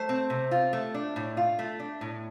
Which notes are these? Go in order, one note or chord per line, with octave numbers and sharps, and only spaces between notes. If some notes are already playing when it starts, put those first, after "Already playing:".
Already playing: A3 C5
C4
C3
F4
A3
D4
A2
F4
A3
D4
A2